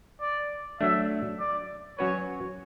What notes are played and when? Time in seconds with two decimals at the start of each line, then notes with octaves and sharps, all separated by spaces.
0.21 D5
0.80 F#3 A3 D4 E5
1.40 D5
1.98 F#3 C#4 F#4 B4 C#5